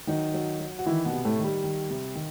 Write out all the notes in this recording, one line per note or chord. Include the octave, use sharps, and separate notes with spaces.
D#3 F#3 D#4
F#3
F#3
F#4
D#3 E3 E4
B2 B3
C3
A2 A3
D#3
G3
D#3
C3
D#3